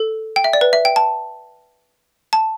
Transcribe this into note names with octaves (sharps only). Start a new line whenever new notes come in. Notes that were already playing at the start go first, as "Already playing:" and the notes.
Already playing: A4
G5
E5
D5
B4
E5
G5
A5
A5